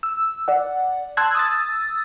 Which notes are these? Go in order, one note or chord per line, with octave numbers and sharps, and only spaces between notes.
E6
D5 F#5
A5 C6 E6 F#6 G#6
D#6 E6 A6